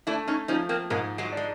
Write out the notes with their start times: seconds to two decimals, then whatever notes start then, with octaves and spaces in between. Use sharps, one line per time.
0.07 A3 D4 E4
0.28 C#4 D#4
0.48 F3 C#4 D#4
0.69 A#3 C4
0.90 G#2 G#3 A#3
1.18 F#3 G#3
1.32 G#3 D4